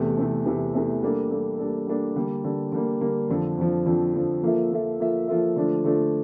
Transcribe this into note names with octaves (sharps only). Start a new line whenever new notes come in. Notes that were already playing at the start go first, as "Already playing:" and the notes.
Already playing: E2 C3 E3 A3
E2 C3 E3 A3
E2 C3 E3 A3
E2 C3 E3 A3
G3 A#3 D4 A4
G3 A#3 D4 A4
G3 A#3 D4 A4
G3 A#3 D4 A4
D3 G3 A#3
D3 G3 A#3
D3 G3 A#3
D3 G3 A#3
F2 D3 F3
F2 D3 F3
F2 D3 F3
F2 D3 F3
F3 A#3 F4 A4 E5
F3 A#3 F4 A4 E5
F3 A#3 F4 A4 E5
F3 A#3 F4 A4 E5
D3 F3 A3 D4 F4
D3 F3 A3 D4 F4